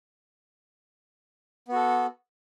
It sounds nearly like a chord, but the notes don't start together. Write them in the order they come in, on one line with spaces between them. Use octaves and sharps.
B3 F#4 A4